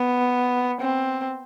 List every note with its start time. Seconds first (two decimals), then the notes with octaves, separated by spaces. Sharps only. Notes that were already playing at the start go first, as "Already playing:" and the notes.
Already playing: B3
0.80 C4